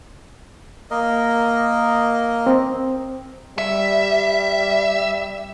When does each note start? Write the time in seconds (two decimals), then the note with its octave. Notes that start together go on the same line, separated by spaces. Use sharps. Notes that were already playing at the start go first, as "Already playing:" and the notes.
0.91 A#3 A#4 D#5
2.47 C4
3.58 G3 E5